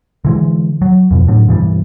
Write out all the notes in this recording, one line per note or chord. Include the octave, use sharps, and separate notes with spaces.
D3 E3 G#3
F#3
F2 B2
F#2 A2 D3
G2 B2 E3 G3